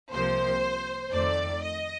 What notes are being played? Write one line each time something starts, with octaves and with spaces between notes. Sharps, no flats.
C2 C3 F3 A#3 C5
F2 D#3 A3 D5
D#5